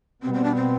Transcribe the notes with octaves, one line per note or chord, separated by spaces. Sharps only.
B2 G3 B3 C4
C4
D4
C4